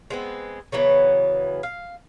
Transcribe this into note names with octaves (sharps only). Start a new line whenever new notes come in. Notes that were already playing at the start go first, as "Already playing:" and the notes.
G#3 B3 C4
C#3 E3 F#3 B3
F5